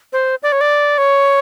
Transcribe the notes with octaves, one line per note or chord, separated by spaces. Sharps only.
C5
D5
C#5
D5
C#5